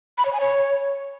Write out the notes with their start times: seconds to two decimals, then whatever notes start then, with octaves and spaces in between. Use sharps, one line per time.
0.18 B5
0.25 C#5
0.33 G#5
0.40 C#5